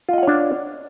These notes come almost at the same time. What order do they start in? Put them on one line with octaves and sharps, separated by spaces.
F4 D#5 F#5 C#5 D4